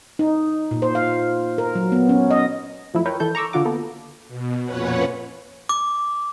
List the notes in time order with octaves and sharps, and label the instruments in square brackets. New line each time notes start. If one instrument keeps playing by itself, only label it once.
[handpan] D#4
A#2
C5
F5
A#4
F#3
B3
C#4
D#5
[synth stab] F#2 F3 A3 E4
A#4 B4 C#5 G5
E3 A4 G6
A#5 C#6 D6 E6
D3 F4 F#4 D6
A#3 B3 A4
[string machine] B2
F2 A#2 C#4 B4 C#5 F#5
[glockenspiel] D6